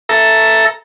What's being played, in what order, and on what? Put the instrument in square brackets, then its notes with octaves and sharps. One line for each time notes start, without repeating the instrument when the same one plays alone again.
[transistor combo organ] A4 E5 A#5